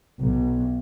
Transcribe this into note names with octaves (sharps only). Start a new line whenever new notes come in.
B1